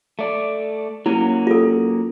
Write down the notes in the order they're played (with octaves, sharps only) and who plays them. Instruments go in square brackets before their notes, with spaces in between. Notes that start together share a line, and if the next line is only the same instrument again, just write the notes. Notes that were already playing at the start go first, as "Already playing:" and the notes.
[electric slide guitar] A3 D5
[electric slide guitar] F#3 A#3 C#4 [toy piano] E4
[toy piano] F4 A4